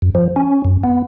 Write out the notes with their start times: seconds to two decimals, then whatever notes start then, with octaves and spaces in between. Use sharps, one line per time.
0.02 F#2
0.15 F3
0.36 C#4
0.65 F#2
0.84 B3